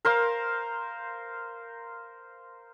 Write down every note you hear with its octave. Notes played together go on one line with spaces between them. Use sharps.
A#4 C5 F5